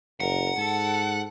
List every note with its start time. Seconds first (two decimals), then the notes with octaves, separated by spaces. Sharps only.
0.20 F#1 A#4 F#5
0.56 G#2 A4